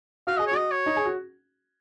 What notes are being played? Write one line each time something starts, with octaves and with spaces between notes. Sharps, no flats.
F#4 F5
G#4 D#5
C#5
F#4
D#5
C#5
D#4
G#4
F#4